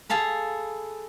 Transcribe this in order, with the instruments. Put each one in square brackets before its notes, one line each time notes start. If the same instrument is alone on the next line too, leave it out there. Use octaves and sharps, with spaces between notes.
[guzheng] G#4 A4 F5 B5